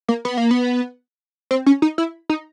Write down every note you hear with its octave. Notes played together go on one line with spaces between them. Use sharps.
A#3
B3
A#3
B3
C4
C#4
D#4
E4
D#4